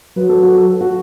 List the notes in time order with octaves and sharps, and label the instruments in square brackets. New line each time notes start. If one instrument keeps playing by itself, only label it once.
[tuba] F#3 [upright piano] B4
[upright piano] A4
F#4
A4
F#4